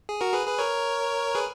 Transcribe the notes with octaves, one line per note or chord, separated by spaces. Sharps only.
G#4
F#4 A#4
G#4 B4
G#4 B4
A#4 C#5
G#4 B4